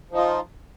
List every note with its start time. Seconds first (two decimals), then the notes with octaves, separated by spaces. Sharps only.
0.11 F3
0.14 D#4
0.17 F4